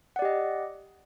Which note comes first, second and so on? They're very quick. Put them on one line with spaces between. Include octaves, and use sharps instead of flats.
F#5 D5 G4 D#5